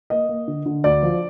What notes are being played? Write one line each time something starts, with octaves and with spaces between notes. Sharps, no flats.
A#3 D#5
A#3
D3
D3
D2 D5
F3